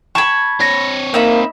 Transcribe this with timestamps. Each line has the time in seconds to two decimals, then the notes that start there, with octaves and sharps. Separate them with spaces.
0.15 A5 B5 C#6 G#6
0.60 C4 C#5 A#6
1.14 A#3 D#4 E5 B5